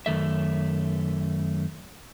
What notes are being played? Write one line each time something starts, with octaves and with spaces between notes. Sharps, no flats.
F#2 D#3 A3 E5